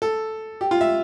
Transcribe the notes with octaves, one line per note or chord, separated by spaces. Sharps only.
A4
G4
F4
E5